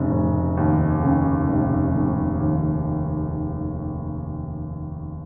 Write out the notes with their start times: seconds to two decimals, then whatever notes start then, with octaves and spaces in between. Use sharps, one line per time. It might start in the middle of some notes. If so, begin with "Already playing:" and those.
Already playing: F1 C#3
0.11 F1
0.57 D#2
1.03 C#3
1.48 F1
1.95 F1
2.40 D#2